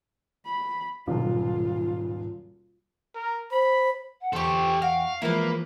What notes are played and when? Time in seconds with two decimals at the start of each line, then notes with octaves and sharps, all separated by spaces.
0.46 B5
1.07 D#1 B1 G#2 D#3 F#3 F4
3.15 A#4
3.51 C5 B5
4.21 F#5
4.33 E2 G4 A4 C5 G5 C#6
4.82 F#4 F5
5.22 E3 F3 G#3 A#3 E4 A#4 B4